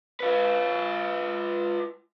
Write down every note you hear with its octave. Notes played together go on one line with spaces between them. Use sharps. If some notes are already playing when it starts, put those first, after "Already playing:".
F4 B4